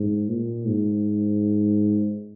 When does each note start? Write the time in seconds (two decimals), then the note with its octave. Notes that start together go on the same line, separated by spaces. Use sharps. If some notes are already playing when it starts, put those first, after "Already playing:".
Already playing: G#2
0.29 A#2
0.67 G#2